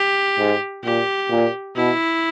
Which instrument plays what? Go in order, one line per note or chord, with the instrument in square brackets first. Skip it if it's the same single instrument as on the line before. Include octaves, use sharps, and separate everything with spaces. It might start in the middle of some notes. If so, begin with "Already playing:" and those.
Already playing: [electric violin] G4
[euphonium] G#2
[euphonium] A#2 [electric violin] G4
[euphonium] A#2
[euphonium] B2 [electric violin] E4